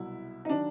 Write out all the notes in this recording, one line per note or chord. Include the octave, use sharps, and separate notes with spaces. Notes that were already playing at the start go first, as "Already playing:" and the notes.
Already playing: C2 B2 F#3 E4
D#4
D#3 F#3 D4